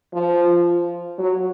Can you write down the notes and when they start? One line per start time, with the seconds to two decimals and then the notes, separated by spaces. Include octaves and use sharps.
0.13 F3
1.18 F#3